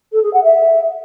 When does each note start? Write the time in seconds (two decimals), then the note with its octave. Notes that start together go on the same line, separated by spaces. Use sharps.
0.12 A4
0.22 G#4
0.33 F#5
0.43 E5